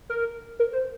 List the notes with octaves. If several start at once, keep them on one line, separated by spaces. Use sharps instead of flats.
A#4
A#4
C5